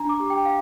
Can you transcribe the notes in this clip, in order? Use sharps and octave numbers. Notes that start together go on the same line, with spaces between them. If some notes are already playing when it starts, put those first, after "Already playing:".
Already playing: D4 A#5
D6
G4
G5
F5